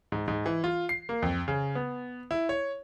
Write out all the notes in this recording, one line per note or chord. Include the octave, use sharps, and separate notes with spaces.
G#2
G#2
E3
F4
C7
A#3
F2
C#3
B3
E4
C#5